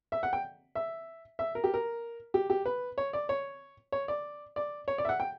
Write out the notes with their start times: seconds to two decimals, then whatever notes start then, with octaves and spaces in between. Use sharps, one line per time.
0.12 E5
0.23 F#5
0.33 G5
0.75 E5
1.39 E5
1.55 A#4
1.64 G4
1.74 A#4
2.34 G4
2.50 G4
2.66 B4
2.98 C#5
3.13 D5
3.29 C#5
3.92 C#5
4.08 D5
4.56 D5
4.88 C#5
4.98 D5
5.05 E5
5.09 F#5
5.20 G5